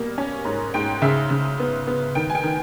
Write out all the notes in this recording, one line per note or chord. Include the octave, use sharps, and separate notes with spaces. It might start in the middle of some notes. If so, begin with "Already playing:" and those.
Already playing: B2 G3 A#3
C#4
G#2
G#2 G5
C#3 E5
C#3
B3
B3
D#3 G5
G#5
G5
D#3